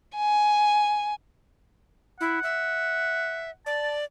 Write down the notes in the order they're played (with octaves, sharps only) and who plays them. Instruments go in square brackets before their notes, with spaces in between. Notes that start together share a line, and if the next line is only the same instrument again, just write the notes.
[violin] G#5
[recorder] E4 [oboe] F#5
[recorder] E5
[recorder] D5 [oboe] A5